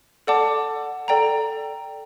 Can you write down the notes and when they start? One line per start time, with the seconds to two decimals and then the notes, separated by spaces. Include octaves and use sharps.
0.27 A4 D5 F#5 A5 D6
1.08 A4 D5 G5 A#5